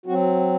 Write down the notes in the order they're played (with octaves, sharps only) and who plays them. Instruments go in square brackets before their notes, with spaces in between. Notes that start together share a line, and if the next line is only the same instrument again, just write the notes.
[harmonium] F#3 C4 F#4